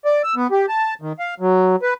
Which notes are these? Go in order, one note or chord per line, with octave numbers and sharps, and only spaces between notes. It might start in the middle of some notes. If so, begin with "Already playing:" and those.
D5
E6
B3
G4
A5
D#3
F5
F#3
B4